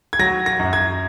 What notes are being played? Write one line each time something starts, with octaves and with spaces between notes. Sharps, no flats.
G#6
F#3 A#6
A#6
F#2
G#6